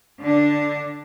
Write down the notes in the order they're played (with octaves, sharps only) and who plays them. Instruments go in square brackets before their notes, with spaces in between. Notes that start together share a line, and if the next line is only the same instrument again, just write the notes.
[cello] D3 D4